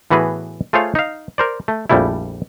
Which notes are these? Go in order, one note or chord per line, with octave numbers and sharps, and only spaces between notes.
A2 E3 B3 F#4 G#4 B4
A3 F4 G#4 C5 C#5 F5
D#4 F5
A#4 C5 D5
A3
A#1 F2 G3 A3 E4